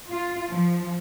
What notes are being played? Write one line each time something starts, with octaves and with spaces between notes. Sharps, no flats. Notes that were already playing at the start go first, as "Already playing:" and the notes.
F4
F3